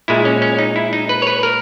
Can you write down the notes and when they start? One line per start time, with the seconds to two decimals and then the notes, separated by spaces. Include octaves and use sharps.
0.08 A#2 G#3 E4
0.25 C#4
0.42 C#4
0.59 D#4
0.76 E4
0.93 D#4
1.09 B4
1.22 C#5
1.27 B4
1.43 A#4